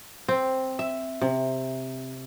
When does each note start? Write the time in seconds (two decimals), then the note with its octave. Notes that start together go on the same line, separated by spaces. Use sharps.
0.28 C4
0.79 E5
1.22 C3